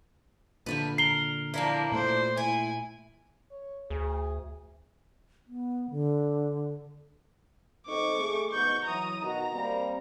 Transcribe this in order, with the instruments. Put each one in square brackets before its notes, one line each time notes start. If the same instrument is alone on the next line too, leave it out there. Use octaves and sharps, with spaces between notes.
[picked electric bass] A#2 D3 [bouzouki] F3 A3 B4
[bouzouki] A#4 [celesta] C7 G7
[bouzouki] F3 D4 E4 [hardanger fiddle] A#3
[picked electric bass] A#2 A3 [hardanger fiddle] C5
[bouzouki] E4 [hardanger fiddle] G#5
[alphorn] C#5
[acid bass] D2 [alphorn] G#4
[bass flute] B3
D3
[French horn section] C4 D#4 A4 [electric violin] C#6 D6
[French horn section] A3 G#4
[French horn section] G#2 B2 B3 [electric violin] C#6 G6
[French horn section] E3 F#3 [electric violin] A#5 D#6
[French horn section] B2 D#3 F#4 [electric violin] A#5
[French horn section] G3 A#3 C4